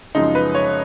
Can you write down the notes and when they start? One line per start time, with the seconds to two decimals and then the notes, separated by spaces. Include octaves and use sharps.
0.15 F#2 C#3 F3 G#3 D#4
0.35 B4
0.55 C#5